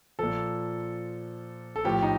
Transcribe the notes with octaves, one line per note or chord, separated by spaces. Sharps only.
A#2 F3 A4
A4
A2 F3 G4
D#4